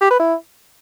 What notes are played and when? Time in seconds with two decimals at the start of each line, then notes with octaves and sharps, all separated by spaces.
0.01 G4
0.10 B4
0.19 E4